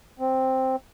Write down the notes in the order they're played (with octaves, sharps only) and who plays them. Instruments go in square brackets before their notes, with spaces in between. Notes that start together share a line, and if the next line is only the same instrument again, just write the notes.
[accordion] C4